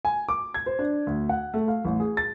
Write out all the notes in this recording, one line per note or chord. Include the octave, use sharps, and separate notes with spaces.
G#5
D6
G#6
C5
D4
D2
F#5
A3
F5
A1
G#4
A6